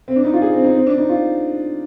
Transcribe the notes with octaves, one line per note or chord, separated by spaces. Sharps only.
C4
D4
D#4
F4
G#4
C4
D#4
C4
D4
D#4
F4